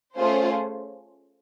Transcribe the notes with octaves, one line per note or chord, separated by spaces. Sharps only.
A3 C#4 F4 G#4 C5